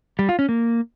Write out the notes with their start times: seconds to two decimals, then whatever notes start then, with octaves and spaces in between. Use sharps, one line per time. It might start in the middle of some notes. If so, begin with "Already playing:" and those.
0.19 G3
0.29 F4
0.39 C#4
0.49 A#3